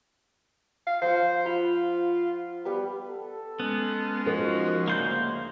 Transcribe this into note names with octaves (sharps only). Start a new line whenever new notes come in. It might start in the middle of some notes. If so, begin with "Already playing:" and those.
F5
F3 C5 F#5
F4 B5
G3 B3 G4 B4
A4
G#3 B3 C#4
F3 D#4 F#4 A#4
D2 C#3 A#3 C5 G6